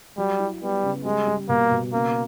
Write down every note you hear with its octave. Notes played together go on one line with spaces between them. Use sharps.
F#3 G3
E4
G3 B3
C#3
G3 G#3
G3
B2 A#3
B2
C#3 A#3